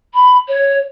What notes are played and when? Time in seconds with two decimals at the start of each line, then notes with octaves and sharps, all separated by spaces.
0.14 B5
0.48 C#5